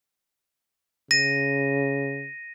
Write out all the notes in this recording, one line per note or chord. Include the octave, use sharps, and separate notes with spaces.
C#3 A#6 D#7